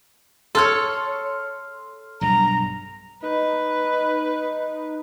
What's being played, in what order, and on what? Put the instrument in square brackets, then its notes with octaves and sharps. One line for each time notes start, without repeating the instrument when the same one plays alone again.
[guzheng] A4 C#5 [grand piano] C6 F6
[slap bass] B1 G2 G3 [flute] A#5
[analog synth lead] D#4 [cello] B4